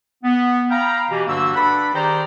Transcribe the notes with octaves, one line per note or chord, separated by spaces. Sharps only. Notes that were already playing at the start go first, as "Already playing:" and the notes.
B3
F5 G5 A#5 B5
B2 E3 G4
G2 D3 F#3 A#3 F#4 E6
D4 A4 B4 F#5 B5
D#3 G4 G#4 C5 D5 A#5